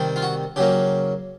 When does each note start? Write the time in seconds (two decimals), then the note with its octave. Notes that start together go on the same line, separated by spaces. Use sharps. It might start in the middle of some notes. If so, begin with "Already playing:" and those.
Already playing: C3 D#3 G3
0.16 F4
0.22 F#4
0.56 C#3 F#3 A#3 G4